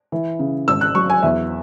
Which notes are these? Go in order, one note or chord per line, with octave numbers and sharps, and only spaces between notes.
E3
C#3
G#1 E6
F#6
F#3 C#6
G#5
E2 E5